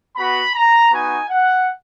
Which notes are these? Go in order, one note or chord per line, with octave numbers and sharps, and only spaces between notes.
B3 F#4 B5
A#5
B3 D#4 F#4 G#5
F#5